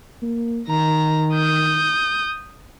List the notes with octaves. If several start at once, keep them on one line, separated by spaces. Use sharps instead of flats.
A#3
D#3 A#5
D#6 G6